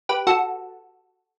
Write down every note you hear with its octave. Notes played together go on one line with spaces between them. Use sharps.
G4 B4
F#4 A4